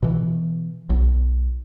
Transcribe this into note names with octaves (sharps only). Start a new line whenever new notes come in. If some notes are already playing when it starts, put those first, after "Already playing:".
B2 E3
B1